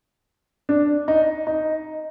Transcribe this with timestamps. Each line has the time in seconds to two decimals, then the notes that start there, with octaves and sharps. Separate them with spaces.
0.69 D4
1.08 D#4
1.47 D#4